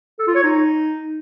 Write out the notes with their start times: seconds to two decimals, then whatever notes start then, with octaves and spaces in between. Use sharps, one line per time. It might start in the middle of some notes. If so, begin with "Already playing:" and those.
0.19 A4
0.27 F4
0.35 C#5
0.44 D#4